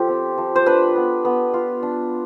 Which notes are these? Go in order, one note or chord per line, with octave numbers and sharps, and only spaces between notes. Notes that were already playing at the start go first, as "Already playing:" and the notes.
Already playing: F3 F4 G4 A4
C4
F3
C5
D4 B4
B3
B3
F4
D4